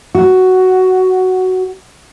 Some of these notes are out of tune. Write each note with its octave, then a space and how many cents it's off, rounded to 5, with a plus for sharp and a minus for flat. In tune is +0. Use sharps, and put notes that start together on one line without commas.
F#4 +5